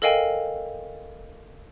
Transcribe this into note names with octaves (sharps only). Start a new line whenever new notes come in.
A4 A#4 D#5 F5 G5 G#5